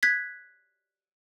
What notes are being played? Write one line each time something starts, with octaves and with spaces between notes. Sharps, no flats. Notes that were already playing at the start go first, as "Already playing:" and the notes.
F#6 G#6 B6